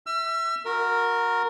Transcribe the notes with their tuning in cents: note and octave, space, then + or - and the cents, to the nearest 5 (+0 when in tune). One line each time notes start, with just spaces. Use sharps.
E5 -10 E6 +40
F#4 -25 A#4 +0